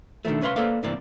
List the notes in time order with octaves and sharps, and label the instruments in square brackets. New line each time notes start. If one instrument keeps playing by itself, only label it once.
[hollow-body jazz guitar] B2 D3 D#3 F3 A3
C2 C#4 B4 F5 C6
A#3 A4 B4 C5 D5 F5
G2 C3 E3 A#3 D5